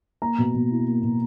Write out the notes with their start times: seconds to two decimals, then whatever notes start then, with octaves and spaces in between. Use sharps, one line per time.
0.22 A#3 A#5
0.38 B2
0.54 B2
0.71 E4
0.87 A#3
1.03 B2